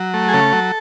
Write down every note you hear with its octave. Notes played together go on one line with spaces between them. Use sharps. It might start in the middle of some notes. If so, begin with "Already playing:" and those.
Already playing: F#3
A3
G#4
C#3 A4
F#3